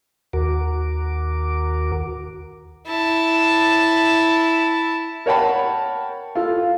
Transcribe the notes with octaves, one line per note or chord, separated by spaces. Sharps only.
D#2 F#4 A#4 D6
E4 A5
A#4 C#5 F#5 G5 A5 B5
F4 A4